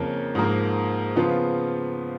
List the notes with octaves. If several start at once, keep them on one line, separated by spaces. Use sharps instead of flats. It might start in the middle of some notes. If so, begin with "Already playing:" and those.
Already playing: F2 C#3 F3 A#3 C#4
G#2 F3 A#3
C#3 F3 B3 F4